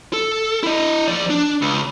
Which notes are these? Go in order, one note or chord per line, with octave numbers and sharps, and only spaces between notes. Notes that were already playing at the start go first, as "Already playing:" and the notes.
A4
E4 D#5
F3 D5
D4
C#2